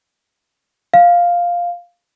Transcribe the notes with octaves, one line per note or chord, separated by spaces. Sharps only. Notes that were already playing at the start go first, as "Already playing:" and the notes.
F5